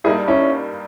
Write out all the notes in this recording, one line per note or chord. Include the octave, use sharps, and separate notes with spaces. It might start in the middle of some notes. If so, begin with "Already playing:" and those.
G2 G3 A#3 D#4 E4 G#4
C#4 E4